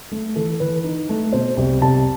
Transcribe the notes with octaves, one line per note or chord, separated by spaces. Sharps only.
A3
E3 A4
E3 B4
D#4
A3
B2 C5
C2
C2 A5